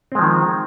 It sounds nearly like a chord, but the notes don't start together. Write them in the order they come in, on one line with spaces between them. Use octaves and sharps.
C4 G#3 F3 D#3